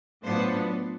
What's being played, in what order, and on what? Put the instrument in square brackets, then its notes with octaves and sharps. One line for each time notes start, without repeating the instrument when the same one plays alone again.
[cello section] A2 F#3 B3 D4 F4 C5